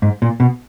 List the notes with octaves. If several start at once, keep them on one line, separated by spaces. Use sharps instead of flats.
G#2
A#2
B2